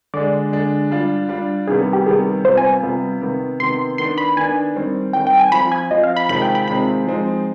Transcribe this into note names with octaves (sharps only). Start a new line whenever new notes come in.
D3 G#3 D4 D5
D3 G#3 D4
G3 D4 F4
G3 D4 F4
C3 D#3 G3 B3 G#4
G4
C3 D#3 G3 B3 G#4
C3 G3 B3 F4 C5
G#5
C3 G3 B3 F4
C3 D#3 B3
C3 D#3 B3 C6
D#3 B3 D4 C6
B5
D#3 B3 D4 G#5
D#3 G3 C4
D#3 G3 C4 G5
G5
G#5
F3 C4 F4 B5
G#5
F3 C4 F4 D#5
F5
B5
C3 D#3 G#3 C4 F4 B5
G5
B5
C3 D#3 G#3 C4 F4 B5
F3 G#3 C4 D#4